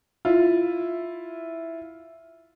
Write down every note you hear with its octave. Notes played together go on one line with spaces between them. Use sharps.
E4 F4